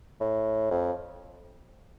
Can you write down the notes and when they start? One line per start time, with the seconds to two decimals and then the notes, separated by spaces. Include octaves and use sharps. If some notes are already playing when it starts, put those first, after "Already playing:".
0.21 A2
0.71 F2